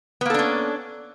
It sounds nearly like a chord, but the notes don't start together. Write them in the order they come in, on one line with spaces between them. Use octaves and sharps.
B3 A#3 A4 D4 C#4